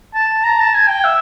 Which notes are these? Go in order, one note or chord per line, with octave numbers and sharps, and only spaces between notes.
A5
A#5
A5
G#5
G5
E5